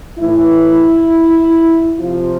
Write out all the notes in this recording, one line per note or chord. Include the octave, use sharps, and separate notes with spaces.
A2 E3 E4
C3 F3 F4